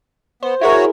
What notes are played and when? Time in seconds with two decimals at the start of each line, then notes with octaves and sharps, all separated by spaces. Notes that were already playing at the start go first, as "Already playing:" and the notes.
0.43 B3 C5
0.61 E4 F#4 G#4 A#4 C#5